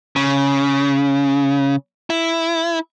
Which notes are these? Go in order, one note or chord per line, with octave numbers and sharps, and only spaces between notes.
C#3
E4